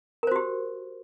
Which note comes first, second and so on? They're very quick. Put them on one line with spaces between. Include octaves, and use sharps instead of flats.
A#4 C5 F#4 G4